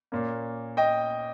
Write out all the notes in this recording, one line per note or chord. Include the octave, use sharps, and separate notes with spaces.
A#2 A#3 C#4
D#5 G5